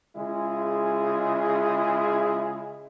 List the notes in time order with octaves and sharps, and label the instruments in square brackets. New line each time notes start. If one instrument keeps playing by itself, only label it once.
[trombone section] C#3 G#3 E4 F4 G#4